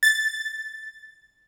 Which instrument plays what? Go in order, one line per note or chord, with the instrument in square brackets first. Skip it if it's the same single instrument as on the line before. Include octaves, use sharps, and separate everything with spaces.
[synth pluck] A6